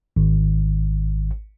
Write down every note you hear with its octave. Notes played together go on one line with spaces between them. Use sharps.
G#1